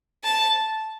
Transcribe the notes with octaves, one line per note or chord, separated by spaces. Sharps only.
A5